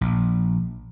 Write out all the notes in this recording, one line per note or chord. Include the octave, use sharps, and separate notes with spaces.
A#1